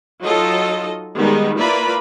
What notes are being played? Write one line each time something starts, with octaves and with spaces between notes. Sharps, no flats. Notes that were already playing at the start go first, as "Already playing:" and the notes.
F#3 D#4 F4 A4 D#5
D#3 G3 G#3 B3 D#4
A#3 E4 F4 B4 D5 B5